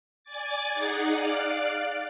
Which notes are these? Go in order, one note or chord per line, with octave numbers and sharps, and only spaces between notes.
D5 G#5 D6 A6
D#4 G#4 F#5
D5 F5 D6 F#6